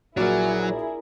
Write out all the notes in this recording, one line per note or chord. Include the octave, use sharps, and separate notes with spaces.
A#1 F#3 E4 F#4 G#4 A#4 D5